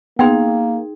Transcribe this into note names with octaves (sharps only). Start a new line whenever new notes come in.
A#3 B3 D#4 G#4 G5 C6